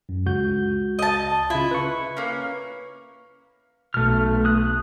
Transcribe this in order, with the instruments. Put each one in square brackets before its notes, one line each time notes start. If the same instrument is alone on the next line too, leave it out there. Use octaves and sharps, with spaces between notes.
[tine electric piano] F#2
C#2 F#4 G6
[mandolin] D#5 A5
[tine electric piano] C#3 F4 [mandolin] E4
[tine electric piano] B4 C#6
[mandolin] A#3 C#4
[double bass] B1 [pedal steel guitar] A3 F6
[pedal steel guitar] D#6 F#6